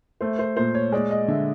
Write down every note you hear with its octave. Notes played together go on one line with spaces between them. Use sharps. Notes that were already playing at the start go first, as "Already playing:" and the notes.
A3 C5
C5
A#2 C5
C#5
G#3 D5
D#5
D3 E5